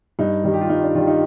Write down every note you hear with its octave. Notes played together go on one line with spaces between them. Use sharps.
G2 D#4
D#3 G3
G4
F4
G2 D#4
D4
D#3 G3 F4
D#4